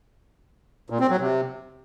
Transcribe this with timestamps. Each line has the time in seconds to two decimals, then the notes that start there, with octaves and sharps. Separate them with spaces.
0.90 A#2
1.00 C4
1.10 F#3
1.20 C3